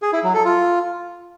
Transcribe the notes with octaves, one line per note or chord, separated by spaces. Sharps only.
G#4
E4
F#3
A4
F4